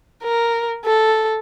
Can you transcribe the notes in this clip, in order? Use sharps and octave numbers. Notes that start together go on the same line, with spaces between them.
A#4
A4